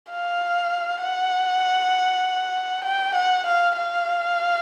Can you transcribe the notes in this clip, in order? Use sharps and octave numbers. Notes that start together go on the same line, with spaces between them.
F5
F#5
G5
F#5
F5
F5